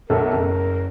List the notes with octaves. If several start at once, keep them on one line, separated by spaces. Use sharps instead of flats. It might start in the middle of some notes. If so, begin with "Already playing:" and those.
B1 A3 A4 A#4
F#1